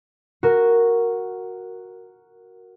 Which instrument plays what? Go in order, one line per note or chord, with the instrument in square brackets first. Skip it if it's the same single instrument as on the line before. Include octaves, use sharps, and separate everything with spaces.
[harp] F#4 A#4